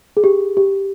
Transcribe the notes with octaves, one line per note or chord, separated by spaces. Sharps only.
G#4
G4
G4